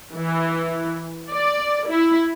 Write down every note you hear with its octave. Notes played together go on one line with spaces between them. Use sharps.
E3
D5
E4